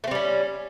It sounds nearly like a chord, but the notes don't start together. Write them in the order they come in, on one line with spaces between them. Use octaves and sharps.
A3 C4 G3 C#4